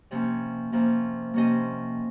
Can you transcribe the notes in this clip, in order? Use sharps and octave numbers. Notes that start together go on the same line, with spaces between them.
C3 F3 A#3 C#4
C3 F3 A#3 C#4
C3 F3 A#3 C#4 D#5